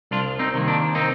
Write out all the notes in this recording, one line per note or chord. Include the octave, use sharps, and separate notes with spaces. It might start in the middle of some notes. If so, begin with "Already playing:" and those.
C2 D4 F4
C4 D#4
C3 D#3 A#3
D4
C4 D#4